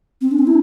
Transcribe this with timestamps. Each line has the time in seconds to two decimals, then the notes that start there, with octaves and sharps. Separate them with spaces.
0.21 C4
0.31 D4
0.39 C4
0.47 E4